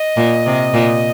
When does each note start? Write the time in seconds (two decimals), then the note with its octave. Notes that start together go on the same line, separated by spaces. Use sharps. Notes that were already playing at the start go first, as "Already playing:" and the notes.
Already playing: D#5
0.17 A#2
0.46 C3
0.74 A#2